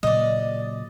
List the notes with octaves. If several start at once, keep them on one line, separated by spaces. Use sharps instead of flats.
A#2 C#3 F#3 D5 D#5